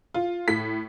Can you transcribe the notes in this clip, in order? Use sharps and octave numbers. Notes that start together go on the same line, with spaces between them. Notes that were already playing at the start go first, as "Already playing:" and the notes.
F4
A2 B6